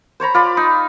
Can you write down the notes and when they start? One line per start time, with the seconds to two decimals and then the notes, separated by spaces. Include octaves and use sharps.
0.20 C5 C#5 A#5 B5
0.34 F4 D5 B5
0.57 D#4